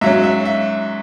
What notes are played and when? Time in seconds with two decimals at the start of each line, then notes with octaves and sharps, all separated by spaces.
0.01 G#2 F#3 C#4 E5
0.24 E5
0.45 E5